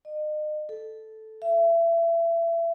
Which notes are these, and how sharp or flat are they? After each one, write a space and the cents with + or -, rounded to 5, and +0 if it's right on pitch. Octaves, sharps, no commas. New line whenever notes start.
D#5 -35
A4 -5
E5 +30